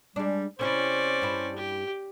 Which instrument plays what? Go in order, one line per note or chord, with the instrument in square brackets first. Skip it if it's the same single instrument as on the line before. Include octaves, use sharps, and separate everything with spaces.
[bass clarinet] G3 [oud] G#3 D4
[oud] C3 C4 E4 [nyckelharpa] C#4 D5 [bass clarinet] C5
[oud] G2 E4
[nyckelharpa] G4